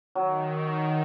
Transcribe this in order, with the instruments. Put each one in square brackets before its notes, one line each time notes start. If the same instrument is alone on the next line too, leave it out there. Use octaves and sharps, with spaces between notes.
[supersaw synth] D#3 [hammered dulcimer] F#3